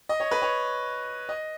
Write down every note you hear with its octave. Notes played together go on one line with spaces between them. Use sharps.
D#5
C#5
B4
C#5
D#5